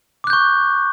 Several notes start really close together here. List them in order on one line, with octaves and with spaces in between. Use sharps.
D6 F#6 G6 C#6